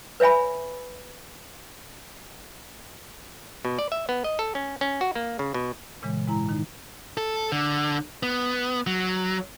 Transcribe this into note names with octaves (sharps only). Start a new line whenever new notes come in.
B4 C#5 E5 G#5 B5
B2
D5
E5
B3
D#5
A4
C#4
C#4
F#4
A#3
C#3
B2
A#2 C#3 E3 G#3
G#2 G#3 E4 A#5
D#3 D#4
A4
D3
B3
F#3